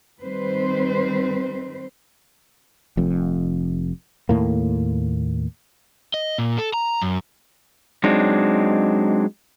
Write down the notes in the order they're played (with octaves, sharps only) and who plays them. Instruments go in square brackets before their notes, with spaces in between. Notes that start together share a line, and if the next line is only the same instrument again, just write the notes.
[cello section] D#3 G3 C4 B4 C5
[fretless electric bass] F1 F2
D#2 A2 A#3
[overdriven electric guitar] D#5
A#2
A4
A#5
F#2
[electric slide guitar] F#3 G#3 C4 D4 D#4